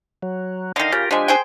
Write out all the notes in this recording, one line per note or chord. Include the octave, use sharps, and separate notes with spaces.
F#3
D3 D#3 D#5 F5
C#3 F4 G4 A#4
F3 G#3 D4 G4 G#5
G#4 C5 G5